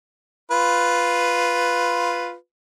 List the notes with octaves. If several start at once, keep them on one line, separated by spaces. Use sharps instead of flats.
F4 B4